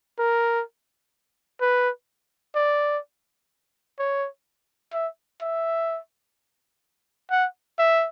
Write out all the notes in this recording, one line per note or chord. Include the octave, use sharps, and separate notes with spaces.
A#4
B4
D5
C#5
E5
E5
F#5
E5